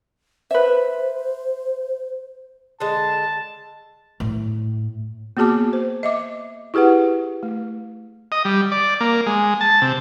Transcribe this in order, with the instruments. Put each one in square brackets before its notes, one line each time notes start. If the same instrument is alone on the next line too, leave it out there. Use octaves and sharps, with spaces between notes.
[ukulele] B4 E5 [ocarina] C5
[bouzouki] D3 G#3 [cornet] A5
[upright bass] A2
[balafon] A#3 B3 F#4 G#4 A5 D6
C5
D#5 E5 D6
E4 G4 G#4 B4 F#5
A3
[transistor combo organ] D#5
G3
D5
A#3
G#3
A5
C3